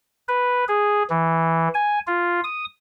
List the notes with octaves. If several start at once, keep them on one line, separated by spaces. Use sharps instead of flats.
B4
G#4
E3
G#5
F4
D#6